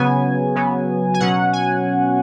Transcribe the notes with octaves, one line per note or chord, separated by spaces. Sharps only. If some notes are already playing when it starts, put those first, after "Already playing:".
Already playing: C#3 F#3 B3 G#5
C#3 F#3 B3
G#5
B2 F#3 C#4 F#5
G#5